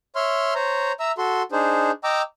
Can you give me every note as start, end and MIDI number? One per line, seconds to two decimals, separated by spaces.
0.16 0.54 73
0.16 0.54 76
0.16 0.54 84
0.16 0.54 89
0.55 0.92 72
0.55 0.92 73
0.55 0.92 82
1.00 1.12 76
1.00 1.12 82
1.00 1.12 88
1.18 1.42 66
1.18 1.42 69
1.18 1.42 84
1.52 1.91 62
1.52 1.91 63
1.52 1.91 68
1.52 1.91 72
2.04 2.22 75
2.04 2.22 79
2.04 2.22 82
2.04 2.22 86
2.04 2.22 88